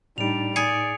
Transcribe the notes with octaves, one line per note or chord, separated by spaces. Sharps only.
A2 G3 D4 D#4 D7 F7
G#4 D5 C#7